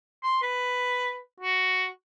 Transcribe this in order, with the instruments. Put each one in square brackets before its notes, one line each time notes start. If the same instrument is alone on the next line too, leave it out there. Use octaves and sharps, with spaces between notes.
[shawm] C6
B4
F#4